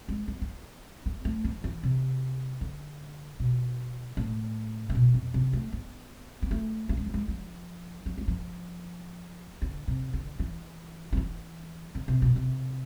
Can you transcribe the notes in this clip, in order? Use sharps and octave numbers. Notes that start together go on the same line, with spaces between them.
G#3
B3
B3
B3
A3
F3
E3
C3
D3
B2
A2
A2
B2
F2
C3
A3
B3
B3
A3
A3
G#3
F3
G#3
F3
F3
G#3
F3
D3
C3
D3
E3
F3
E3
D3
C3
B2
C3